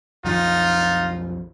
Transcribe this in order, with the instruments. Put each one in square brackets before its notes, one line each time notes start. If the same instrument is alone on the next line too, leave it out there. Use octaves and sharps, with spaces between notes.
[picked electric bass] B1 F2 F3 [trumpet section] D#4 F4